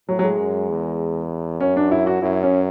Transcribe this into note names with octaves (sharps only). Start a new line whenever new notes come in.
A2 F#3
F#3
G#3
F#2
E2
F#2 C#4
D4
E4
F#4
F#2 E4
C#4